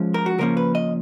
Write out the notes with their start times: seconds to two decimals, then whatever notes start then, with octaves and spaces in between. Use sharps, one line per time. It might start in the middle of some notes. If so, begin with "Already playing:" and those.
Already playing: F3 G#3 C#4
0.14 A#4
0.26 F#4
0.38 C#3 F3 A#3 C#4 A#4
0.57 B4
0.75 D#5